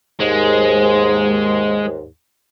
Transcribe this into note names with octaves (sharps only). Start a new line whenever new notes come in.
D#2 G#2 G#3